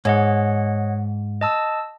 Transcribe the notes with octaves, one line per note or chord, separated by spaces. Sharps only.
G#2 C#5 D#5 F#5
D#5 A5 E6